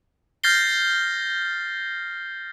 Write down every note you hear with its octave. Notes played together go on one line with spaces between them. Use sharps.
F6 G6 A6 A#6 C7 G7